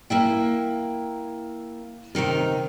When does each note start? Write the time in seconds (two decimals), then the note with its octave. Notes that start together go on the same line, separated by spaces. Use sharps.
0.10 A#3 E4 G5
2.15 C3 D#3 D#4 A#4